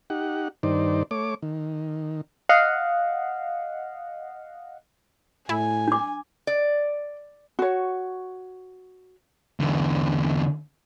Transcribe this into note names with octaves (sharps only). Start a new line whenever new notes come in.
D#4 G4 F#5
G2 D#3 D#4 C5 D5
A3 C#5 D6
D#3
D#5 F5 F#5
A2 E4 G#5
D4 D6
D5
F#4 C#5
E2 D3